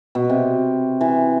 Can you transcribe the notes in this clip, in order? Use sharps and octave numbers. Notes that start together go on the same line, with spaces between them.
B2
C3
E3